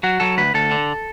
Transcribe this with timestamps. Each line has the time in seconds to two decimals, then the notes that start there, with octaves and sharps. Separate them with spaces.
0.03 F#3 F#4
0.20 F#3 A4
0.38 D2 B4
0.54 D2 A4
0.71 D3